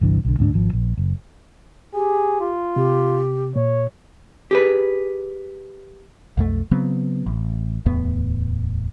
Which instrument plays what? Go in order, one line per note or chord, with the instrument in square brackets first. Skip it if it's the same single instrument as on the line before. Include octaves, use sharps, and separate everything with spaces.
[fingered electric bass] G1 C2 E3 D4
B1 D3
D2 G#2 C4 D4
G#1 F3
A#1
F#1
[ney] G4 [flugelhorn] G#4
[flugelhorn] F4
[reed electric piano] C3 [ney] G4
[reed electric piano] A#2 [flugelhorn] C#5
[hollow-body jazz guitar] G4 G#4 B4
[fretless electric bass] B1 F2 A3
C#3 F#3 B3 C4
A1
D1 E2 A2 B3